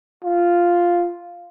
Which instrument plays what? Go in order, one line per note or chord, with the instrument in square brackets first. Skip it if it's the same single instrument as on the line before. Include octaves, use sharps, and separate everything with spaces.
[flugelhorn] F4